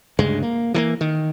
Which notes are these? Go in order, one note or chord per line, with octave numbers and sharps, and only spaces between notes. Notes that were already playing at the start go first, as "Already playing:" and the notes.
D2 G2 C#3 G#3
A#3
E3 G#3 A#3
D#3